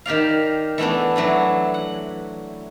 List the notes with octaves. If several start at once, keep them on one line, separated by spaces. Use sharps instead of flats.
D#3 G4 D5 F5
E3 A3 B3 D4
E3 F#3 A3 D4
F#5